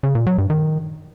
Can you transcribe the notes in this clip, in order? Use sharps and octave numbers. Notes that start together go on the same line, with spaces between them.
C#3
A#2
F#3
G2
D#3